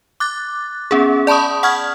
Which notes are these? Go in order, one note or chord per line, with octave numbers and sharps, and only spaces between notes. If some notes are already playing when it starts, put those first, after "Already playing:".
D6 F#6 A6
B3 C#4 G#4
D5 A5 B5 C#6 D#6
F#5 C#6 D#6 F6 G#6